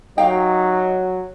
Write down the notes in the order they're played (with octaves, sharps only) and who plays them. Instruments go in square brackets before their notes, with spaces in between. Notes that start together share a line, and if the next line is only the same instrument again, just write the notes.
[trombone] F#3 [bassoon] D#4 [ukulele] G4 F5 G5